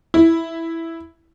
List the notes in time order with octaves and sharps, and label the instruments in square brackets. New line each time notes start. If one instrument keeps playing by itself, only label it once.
[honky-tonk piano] E4